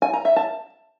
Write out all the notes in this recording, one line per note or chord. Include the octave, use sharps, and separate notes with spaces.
G#5
A#5
E5
A5